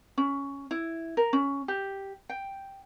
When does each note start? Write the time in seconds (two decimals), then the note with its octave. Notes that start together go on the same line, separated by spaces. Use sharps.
0.18 C#4
0.71 E4
1.17 A#4
1.33 C#4
1.68 G4
2.30 G5